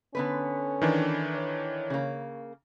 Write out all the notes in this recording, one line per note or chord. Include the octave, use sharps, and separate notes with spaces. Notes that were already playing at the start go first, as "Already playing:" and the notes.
D3 B3 C#4 B4
D#3 E3 D4
C#5
C#3 A#3